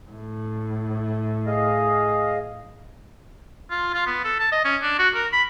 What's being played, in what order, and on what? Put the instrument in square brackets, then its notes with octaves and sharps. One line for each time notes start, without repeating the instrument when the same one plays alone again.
[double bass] A2
[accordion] G#4 D#5 F5
[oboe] F4
F4
B3
A4
A5
D#5
C#4
D4
F#4
A#4
B5